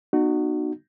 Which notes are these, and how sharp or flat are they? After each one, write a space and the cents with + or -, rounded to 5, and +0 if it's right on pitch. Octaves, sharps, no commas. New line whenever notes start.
B3 -10 D#4 -35 F#4 +0